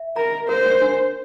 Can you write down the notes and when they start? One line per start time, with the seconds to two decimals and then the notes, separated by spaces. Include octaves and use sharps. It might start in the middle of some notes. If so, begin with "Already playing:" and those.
Already playing: E5
0.16 A#4 A#5
0.49 A#4 C5
0.82 D4